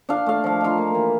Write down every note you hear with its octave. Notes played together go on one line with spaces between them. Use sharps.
D4 F5
A3 F5
F3 F5
D#4 F4 F5
A#3
E3